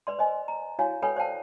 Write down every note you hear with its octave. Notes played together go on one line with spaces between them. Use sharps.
B4 D5 C6
C5 D#5 G#5
A#5
E4 F#4 C#5 F5 G#5
A4 B4 C#5 G5 G#5 B5
C5 D5 F5 G5 A5